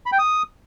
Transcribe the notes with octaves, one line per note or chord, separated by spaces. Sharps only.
B5
G5
D#6